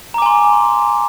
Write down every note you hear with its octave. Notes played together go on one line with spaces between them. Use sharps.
G#5 A#5 C6 D6